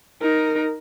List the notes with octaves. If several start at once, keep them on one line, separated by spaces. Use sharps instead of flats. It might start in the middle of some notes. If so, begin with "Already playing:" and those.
D#4 A#4